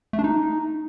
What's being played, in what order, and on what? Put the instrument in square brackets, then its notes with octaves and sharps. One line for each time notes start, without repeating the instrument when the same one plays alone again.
[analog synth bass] A3
D4
D#4